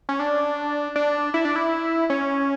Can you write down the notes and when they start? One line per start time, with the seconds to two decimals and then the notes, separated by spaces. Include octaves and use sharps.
0.09 C#4
0.19 D4
0.96 D4
1.34 E4
1.45 D4
1.56 E4
2.10 C#4